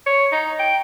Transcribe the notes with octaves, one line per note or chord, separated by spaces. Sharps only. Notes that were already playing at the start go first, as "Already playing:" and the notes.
C#5
D#4
G5